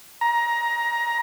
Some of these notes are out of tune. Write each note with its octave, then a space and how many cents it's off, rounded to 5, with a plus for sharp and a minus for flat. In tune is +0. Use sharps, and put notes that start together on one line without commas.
A#5 +20